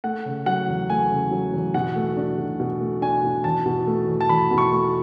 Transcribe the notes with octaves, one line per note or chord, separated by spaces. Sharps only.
A3 F#5
C#3
F#3 F#5
E2
A3 G#5
C#3
F#3
E2
B2 F#5
A3
D4
B2
B2
A3
D4 G#5
B2
E2 A5
B2
A3
E2
A5
E2 B5
B2
C#6
A3